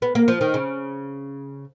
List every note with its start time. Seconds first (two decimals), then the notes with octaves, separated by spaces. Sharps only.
0.02 B3
0.15 A#3
0.28 F3
0.41 D#3
0.54 C#3